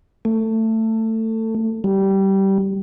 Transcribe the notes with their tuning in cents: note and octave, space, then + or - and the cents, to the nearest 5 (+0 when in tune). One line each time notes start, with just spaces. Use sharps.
A3 +20
G3 -15